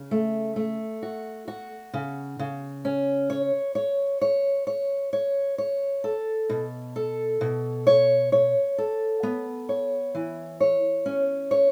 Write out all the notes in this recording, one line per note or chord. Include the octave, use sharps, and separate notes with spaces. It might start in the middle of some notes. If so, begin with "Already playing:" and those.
Already playing: C#3
A3
A3
F#4
F#4
C#3
C#3
C#4
C#5
C#5
C#5
C#5
C#5
C#5
A4
B2
A4
B2
C#5
C#5
A4
B3
C#5
E3
C#5
C#4
C#5